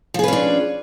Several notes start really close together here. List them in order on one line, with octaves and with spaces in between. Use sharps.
F3 G#4 B4 C#4 D4